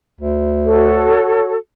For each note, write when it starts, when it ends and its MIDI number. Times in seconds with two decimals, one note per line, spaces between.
0.20 1.15 38
0.64 1.53 66
0.64 1.53 69
0.64 1.53 73